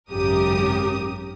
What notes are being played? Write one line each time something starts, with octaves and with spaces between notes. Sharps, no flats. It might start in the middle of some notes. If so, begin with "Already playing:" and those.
G#1 F#2 C#3 G4 A#4 D#6